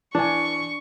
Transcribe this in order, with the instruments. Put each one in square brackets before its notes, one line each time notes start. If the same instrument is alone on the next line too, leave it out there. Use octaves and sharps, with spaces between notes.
[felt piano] E3 G#5 [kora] D4 [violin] C#6